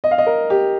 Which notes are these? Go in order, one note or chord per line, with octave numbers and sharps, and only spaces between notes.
D#5
F5
D#5
A#4
G4